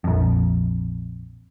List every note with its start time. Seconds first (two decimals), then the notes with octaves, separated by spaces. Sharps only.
0.04 A#1 F2